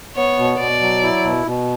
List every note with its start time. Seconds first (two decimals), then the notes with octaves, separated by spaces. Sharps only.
0.16 B3 C#5
0.38 B2
0.59 B2 D5
0.81 F#3
1.03 E4
1.24 B2
1.47 B2